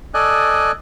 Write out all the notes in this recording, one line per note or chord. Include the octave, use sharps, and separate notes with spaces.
A4 D5 D#5 G#5 F#6